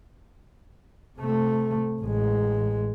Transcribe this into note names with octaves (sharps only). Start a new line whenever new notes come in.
C3 A3
A1 G#3